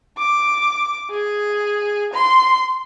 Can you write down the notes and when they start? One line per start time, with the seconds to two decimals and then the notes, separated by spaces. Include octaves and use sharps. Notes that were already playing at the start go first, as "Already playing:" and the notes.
0.18 D6
1.11 G#4
2.13 C6